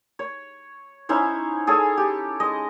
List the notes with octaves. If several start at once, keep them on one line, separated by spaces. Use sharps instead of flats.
C#5
C#4 D#4 E4 C5
G#4 A4 C#5 G#5
G4
G#3 D#5